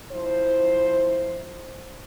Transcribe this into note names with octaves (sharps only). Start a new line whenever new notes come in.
F3 E4 C5